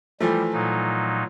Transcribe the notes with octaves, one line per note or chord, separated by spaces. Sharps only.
E3 F3 G3 A3
A#2 F#3 D#4